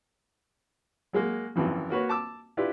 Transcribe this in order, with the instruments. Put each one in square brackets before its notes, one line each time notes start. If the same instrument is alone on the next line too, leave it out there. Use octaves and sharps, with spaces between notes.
[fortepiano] F#3 G#3 A#3
G#1 F#2 E3 F3
A#3 F#4 B4 C#5
A5 D6 E6
D4 E4 F4 G4 B4